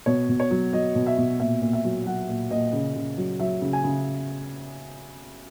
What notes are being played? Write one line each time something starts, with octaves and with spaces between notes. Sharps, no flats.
B2 C#5
B2
C#5
F#3
F#3 D#5
B2
E5
B2
A#2 E5
A#2
E5
F#3
F#3 F#5
A#2
A#2 D#5
C#3
C#3
F#3
F#3 E5
C#3
G#5
C#3